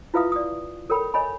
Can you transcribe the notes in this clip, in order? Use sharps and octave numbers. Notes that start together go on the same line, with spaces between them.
E4 F4 B4 E5 F5 D#6
D5 D#6
A4 A#4 C#5 G5 B5
C#5 D#5 G#5 B5